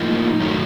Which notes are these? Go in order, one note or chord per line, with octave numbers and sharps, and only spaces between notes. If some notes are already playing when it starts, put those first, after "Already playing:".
Already playing: A2 F3 A#3 D#4
F#2 D#3 F#3 A3